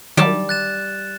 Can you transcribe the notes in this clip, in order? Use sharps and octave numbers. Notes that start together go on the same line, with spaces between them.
D#3 F#3 G3 A5
F#6 A6 E7